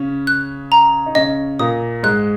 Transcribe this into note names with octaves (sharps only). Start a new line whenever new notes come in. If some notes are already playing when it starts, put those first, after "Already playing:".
Already playing: C#3 C#4
F#6
A#5
D#4
C#3 C#4 D#5
A#2 A#3 D#6
G#2 G#3 F#6